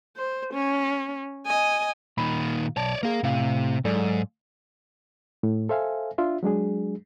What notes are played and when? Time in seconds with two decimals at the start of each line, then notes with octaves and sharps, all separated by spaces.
0.17 C5
0.54 C#4
1.46 D#5 G#5
2.18 A#2 D#3 B5
2.77 B1 C#5 D5 A5
3.03 A#3 G#4 A#4 F5
3.23 A2 C3 F5
3.85 G#2 F#3 A4 D5
5.43 A2
5.69 A4 C5 E5 F5 G#5
6.18 D4 F4 E5
6.43 F#3 G#3 D4 G#4